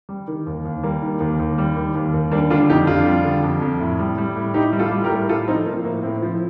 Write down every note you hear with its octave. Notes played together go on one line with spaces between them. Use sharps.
G3
D#3
D#2
D#2
G3 A#3
D#3
D#2
D#2
G3
D#3
D#2
D#2
G3 A#3 D4
D3 D4 F4
F2 D#4 G4
F2 D4 F4
G3
D3
F2
F2
A2
G3
G3
A2
A2 D#4 G4
G3
F4 A4
G3
G4 A#4
A2
A2 F4 A4
F3 C4 D#4
F3 A#3
A2 A#3
A2 C4
F3